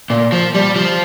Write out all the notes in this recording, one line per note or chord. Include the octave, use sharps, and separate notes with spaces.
A#2
F3
G3
F3